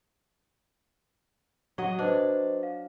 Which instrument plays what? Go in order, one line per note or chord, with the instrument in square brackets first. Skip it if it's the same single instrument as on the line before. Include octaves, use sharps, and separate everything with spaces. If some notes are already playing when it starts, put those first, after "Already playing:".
[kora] F#3 D#5
[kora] D4 [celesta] B4 C5 D#5
[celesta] F5